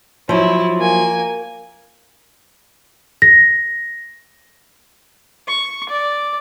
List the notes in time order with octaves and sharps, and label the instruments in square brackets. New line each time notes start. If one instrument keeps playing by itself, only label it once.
[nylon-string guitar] F3 F#3 [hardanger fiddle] E4
[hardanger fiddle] A#3 G#5
[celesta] A#6
[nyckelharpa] C#6
D5